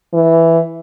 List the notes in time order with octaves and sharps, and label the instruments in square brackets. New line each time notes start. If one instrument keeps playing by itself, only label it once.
[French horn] E3